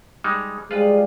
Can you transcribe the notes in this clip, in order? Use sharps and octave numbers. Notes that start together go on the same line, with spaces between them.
G3 G#3 D#4
F3 G3 G#3 F4 G#4 B4